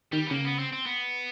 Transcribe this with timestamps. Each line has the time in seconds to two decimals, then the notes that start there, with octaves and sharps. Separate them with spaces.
0.12 D#3 G3
0.27 B3
0.31 C#3 A#3
0.45 B3
0.59 C4
0.72 C4
0.86 B3